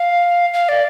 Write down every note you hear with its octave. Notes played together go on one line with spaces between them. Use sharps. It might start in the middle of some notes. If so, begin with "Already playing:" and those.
Already playing: F5
F5
D5